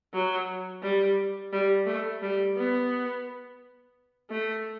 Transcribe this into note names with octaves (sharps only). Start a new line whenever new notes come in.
F#3
G3
G3
A3
G3
B3
A3